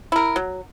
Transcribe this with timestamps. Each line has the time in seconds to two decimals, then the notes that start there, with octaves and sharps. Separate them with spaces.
0.12 E4 A#4
0.36 F#3